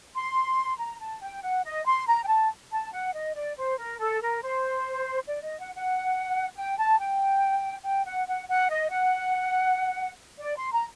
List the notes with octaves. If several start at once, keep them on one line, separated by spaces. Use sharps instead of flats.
C6
A#5
A5
G5
F#5
D#5
C6
A#5
G5
A5
A5
F#5
D#5
D5
C5
A#4
A4
A#4
C5
D5
D#5
F#5
F#5
G5
A5
G5
G5
F#5
F#5
F#5
D#5
F#5
D5
C6
A#5